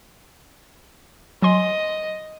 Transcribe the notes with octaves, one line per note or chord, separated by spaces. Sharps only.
F#3 D#5 G#5 C6